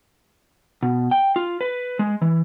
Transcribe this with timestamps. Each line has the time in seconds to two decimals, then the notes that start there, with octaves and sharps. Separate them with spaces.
0.83 B2
1.11 G5
1.36 F4
1.61 B4
1.99 G#3
2.22 E3